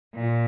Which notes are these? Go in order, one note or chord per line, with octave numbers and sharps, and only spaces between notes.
A#2